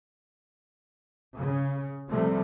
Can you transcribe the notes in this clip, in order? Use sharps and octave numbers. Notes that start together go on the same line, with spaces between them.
C#3
C3 F3 G3 A3 C4